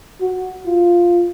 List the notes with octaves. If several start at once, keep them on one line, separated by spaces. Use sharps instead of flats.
F#4
F4